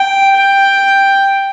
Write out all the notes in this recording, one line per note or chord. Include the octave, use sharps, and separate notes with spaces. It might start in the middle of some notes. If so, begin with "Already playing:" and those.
Already playing: G5
G5